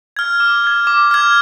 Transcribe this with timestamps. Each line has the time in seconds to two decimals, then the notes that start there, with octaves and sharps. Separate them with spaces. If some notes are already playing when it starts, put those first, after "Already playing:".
0.17 F6 G#6
0.40 D6
0.64 F6 G#6
0.87 D6
1.11 F6 G#6